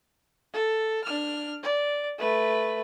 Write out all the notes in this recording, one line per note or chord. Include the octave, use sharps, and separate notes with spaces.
A4
D4 F6
D5
A3 B4